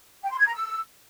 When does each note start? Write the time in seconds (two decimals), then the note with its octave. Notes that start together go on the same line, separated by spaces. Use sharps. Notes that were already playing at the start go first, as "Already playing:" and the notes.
0.23 G5
0.31 C6
0.38 G#6
0.46 A#5
0.54 E6